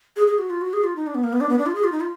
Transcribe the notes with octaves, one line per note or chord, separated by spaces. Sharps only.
G#4
G#4
F#4
F4
F#4
G#4
F4
D#4
D4
B3
A#3
B3
D4
B3
D4
F4
G#4
F4
D#4
F4